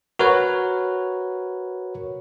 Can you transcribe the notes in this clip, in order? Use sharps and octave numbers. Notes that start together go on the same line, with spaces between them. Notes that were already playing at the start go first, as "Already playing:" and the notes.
F#4 A#4 B4 C#5